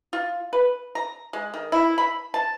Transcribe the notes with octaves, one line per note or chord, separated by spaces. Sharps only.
F4
B4
A#5
G#3
D#3
E4
B5
A5